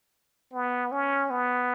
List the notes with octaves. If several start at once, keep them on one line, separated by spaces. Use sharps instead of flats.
B3
C#4
B3